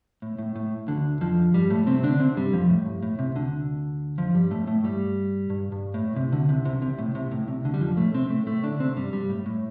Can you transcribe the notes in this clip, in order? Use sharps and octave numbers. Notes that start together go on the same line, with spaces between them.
A2
A2
A2
D2 D3
F2 F3
G2 G3
A2 A3
C3 C4
D3 D4
C3 C4
G2 G3
F2 F3
A2
G2
A2
C2 C3
D2 D3
F2 F3
G2 G3
A2 A3
A2 A3
G2 G3
G2
G2
A2
C2 C3
D2 D3
C2 C3
C2 C3
C2 C3
A2
C2 C3
A2
C2 C3
D2 D3
G3
F2 F3
A2 A3
C3 C4
A2 A3
A2 A3
D3 D4
C3 C4
G2 G3
G2 G3
A2
A2